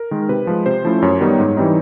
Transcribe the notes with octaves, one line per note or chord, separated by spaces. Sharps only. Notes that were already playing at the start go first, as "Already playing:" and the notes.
Already playing: A#4
D#3 G#3
C3 B4
F3 G#3
C3 C5
F3 A3 C#4 E4
F#2 C#5
D#3 G3 B3 D#4
G#2
E3 G3 C4 D#4